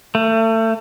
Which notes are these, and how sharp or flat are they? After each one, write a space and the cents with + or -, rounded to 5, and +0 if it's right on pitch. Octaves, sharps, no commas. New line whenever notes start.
A3 +30